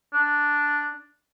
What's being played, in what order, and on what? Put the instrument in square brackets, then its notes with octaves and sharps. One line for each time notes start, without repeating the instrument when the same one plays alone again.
[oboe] D4